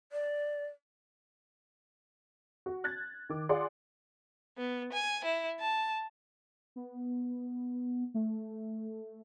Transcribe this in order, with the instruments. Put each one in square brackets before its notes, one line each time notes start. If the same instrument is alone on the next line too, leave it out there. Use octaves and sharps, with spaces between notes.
[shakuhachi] D5
[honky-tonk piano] F#4
F#6 G#6 A6
D#3 D6
F4 G#4 D5 F#5 C6 D6
[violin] B3
G#5
E4
A5
[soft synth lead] B3
A3